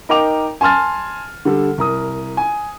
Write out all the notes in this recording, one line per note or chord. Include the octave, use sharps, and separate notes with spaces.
D#4 A#4 D#5 G5 D6 F7
G#5 A5 C6 F6 A6
D3 G3 A4
C2 A#4 D#6
G#5